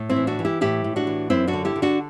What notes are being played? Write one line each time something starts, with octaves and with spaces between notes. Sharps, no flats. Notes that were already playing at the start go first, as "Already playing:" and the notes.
Already playing: A2
C4 E4
E3
D4 F#4
E3
E4 G4
A2 E4 G4
A2
D4 F#4
E3
F#2 C4 E4
D4 F#4
D3
E4 G4
D3
D4 F#4